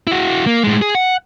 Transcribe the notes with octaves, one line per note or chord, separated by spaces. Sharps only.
E4 F#4
A#3
A2 G#3
G#4
F#5